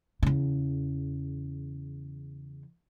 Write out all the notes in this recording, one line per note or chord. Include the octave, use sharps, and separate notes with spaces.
E2 C#3